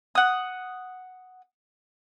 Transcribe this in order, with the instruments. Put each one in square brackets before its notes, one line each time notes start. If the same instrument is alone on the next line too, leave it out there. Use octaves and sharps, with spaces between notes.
[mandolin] F#5 D#6